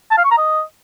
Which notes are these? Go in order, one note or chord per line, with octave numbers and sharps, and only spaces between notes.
A5
F5
C#6
A#5
D#5